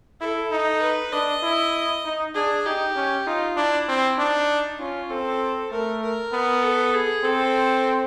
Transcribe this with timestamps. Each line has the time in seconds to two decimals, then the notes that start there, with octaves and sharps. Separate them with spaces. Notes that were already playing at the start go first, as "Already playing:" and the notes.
0.21 E4 A4
0.51 D#4
0.81 B4
1.12 D4 D#5
1.43 E4
2.05 D#4
2.34 D4 G#4
2.66 D#4 G4
2.96 C#4
3.26 D#4 F4
3.57 D4 E4
3.88 C4
4.18 D4 D#4
4.79 C#4 F4
5.10 C4 A4
5.72 A3 A#4
6.02 A#4
6.33 B3
6.63 A4
6.94 G#4
7.24 C4 A4